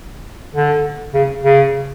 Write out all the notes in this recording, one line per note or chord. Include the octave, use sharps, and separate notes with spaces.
D3
C#3
C#3